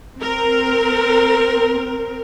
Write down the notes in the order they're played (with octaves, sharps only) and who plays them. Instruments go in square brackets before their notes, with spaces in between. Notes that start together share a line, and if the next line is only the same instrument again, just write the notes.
[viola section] C4 A#4